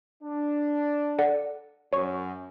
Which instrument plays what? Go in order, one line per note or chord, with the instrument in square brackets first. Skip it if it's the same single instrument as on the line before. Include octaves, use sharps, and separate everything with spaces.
[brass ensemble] D4
[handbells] A4 D5 F#5
[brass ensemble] F#2 [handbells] C#5 C#6